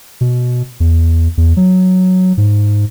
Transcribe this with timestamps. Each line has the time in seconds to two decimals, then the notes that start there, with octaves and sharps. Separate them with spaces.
0.21 B2
0.80 E2
1.37 E2
1.57 F#3
2.37 G#2